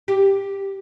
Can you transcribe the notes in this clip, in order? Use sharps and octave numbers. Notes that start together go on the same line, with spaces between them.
G4